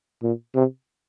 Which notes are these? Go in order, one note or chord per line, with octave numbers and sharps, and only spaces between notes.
A#2
C3